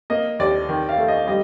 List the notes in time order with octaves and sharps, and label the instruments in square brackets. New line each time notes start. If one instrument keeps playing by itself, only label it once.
[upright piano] A#3 [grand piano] D#5
[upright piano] D#2 [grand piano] D5
[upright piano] D#3
[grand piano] F5
[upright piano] A3
[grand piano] D#5
[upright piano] G3 [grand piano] D#5